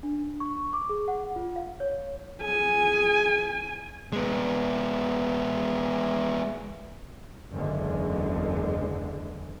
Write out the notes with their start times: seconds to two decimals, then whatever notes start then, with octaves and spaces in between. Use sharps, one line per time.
0.03 D4
0.40 C#6
0.73 D6
0.89 G#4
1.08 F#5
1.36 F4
1.56 F5
1.80 C#5
2.42 G#4 G#5
4.13 G#3 B3
7.53 F#1 E2 D3 G#3